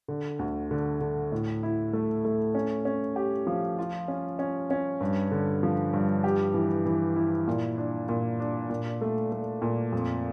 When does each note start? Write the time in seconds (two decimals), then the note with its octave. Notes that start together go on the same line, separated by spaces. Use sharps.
0.08 D3
0.39 D2
0.71 D3
1.01 D3
1.32 A2
1.63 E4
1.93 A3
2.25 A3
2.55 C#4
2.85 C#4
3.16 G4
3.47 F3
3.78 F4
4.08 C#4
4.39 C#4
4.70 C#4
5.01 G2
5.32 D3
5.63 F3
5.93 G2
6.24 G4
6.54 E3
6.86 E3
7.16 E4
7.48 A#2
7.78 D4
8.09 A#2
8.40 D4
8.70 A#2
9.01 A3
9.32 A3
9.62 A#2
9.92 F2